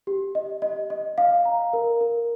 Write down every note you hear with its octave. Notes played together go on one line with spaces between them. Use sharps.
G4
D#5
D#5
D#5
F5
A#5
A#4
A#4